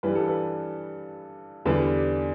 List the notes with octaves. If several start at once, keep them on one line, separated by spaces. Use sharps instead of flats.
G2 E3 G3 B4
A4
B4
E2 D3 G3 B4